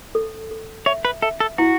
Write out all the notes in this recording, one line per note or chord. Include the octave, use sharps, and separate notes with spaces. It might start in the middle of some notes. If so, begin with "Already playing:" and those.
A4
A4
C#5 E5
B4
A4 E5
A4
E4 F#4